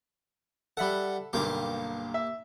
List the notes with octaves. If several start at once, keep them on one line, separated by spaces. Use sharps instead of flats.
G3 A4 E5 F#5 B5
B1 G2 D3 A#3 G4
E5